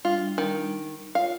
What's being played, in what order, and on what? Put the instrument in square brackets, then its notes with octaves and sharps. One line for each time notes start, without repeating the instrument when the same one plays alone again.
[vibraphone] G3 D4 [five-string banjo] F4
[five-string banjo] D#3
[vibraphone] F4 A#4 C#5 [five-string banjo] F5